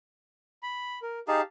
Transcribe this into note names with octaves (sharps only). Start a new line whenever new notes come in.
B5
A#4
D#4 G4 G#4 F5 A5